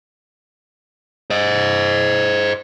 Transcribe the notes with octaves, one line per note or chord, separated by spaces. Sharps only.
C5 D#5